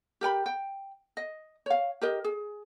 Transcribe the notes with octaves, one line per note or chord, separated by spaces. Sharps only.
G4 A#4 G5 B5
G5
D#5
C#5 F5
G4 A#4 D#5
G#4